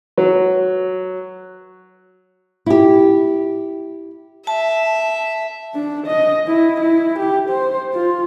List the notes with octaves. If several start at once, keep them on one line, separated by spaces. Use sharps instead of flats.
F#3
E4 G4
E5 A5
D4
D#5
E4
E4
G4
C5
F4